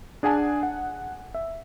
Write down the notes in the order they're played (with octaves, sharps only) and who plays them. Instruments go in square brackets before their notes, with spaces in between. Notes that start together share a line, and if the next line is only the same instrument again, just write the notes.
[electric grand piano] D4 G#4 F#5 G#5 A5
F#5
E5